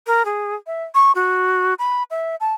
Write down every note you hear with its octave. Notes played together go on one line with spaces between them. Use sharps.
A#4
G#4
E5
C#6
F#4
B5
E5
A5